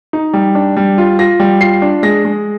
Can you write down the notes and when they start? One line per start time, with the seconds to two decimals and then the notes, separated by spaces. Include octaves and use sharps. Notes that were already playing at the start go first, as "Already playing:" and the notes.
0.13 D#4
0.33 G3
0.55 D4
0.77 G3
0.98 F4
1.19 F4 A#6
1.40 G3
1.61 F4 C7
1.82 D4
2.03 G#3 A#6
2.25 G#3